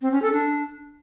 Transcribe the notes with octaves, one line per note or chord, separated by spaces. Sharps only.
C4
C#4
A4
D4